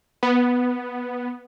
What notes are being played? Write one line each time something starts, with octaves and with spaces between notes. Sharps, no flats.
B3